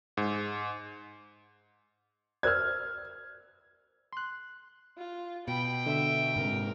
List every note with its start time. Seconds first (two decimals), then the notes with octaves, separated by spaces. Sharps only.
0.17 G#2
2.43 A#4 C5 D5 F6 G#6
4.13 C6 F#6
4.98 F4
5.48 B2 G5 B5
5.86 D3 E5
6.36 G#2 C3 G#3 A#4